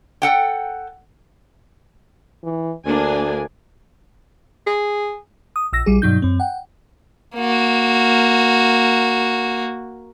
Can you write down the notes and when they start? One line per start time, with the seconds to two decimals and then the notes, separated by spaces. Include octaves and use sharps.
0.22 A4 F#5 G5
2.44 E3
2.86 D2 A#3 D4 G#5
4.67 G#4
5.56 D#6
5.73 A#1 E6 A#6
5.86 A#1 G3 G#4
6.02 G2 B2 F#3 D#4 G6
6.22 F#2 C4
6.40 F#5 G5
7.36 A#3 F#4